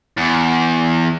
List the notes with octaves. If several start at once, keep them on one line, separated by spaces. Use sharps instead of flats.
E2